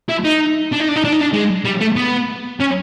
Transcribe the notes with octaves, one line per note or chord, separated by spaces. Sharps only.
E4
D#4
D4
D#4
D4
D#4
D4
D#4
D4
G#3
G3
A3
B3
C#4